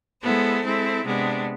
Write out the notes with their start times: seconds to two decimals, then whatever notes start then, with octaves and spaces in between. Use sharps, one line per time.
0.23 G#3 B3 E4 A4 C5
0.64 G#3 C4 E4 A4
1.04 C3 G#3 B3 D4